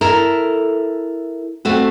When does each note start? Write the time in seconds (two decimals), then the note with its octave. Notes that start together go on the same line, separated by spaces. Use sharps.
0.01 E4 A4 A#4
1.65 A3 C4 F#4